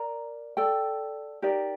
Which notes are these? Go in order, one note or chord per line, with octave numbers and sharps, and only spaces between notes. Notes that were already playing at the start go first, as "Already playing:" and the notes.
Already playing: A#4 D5 A#5
A4 D5 G5
D#4 G4 A#4 D5